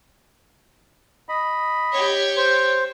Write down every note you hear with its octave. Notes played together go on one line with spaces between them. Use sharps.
D#5 B5
G4 C#5
C5